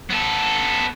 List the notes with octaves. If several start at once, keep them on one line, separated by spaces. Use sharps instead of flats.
B3 A4